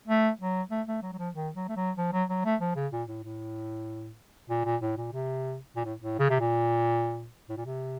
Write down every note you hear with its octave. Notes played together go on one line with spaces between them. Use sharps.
A3
F#3
A3
A3
F#3
F#3
F3
D#3
F#3
A3
F#3
F3
F#3
F#3
A3
F3
C#3
A#2
A2
A2
A#2
A#2
A2
A#2
C3
A#2
A2
A2
C#3
C3
A#2
A2
A#2
C3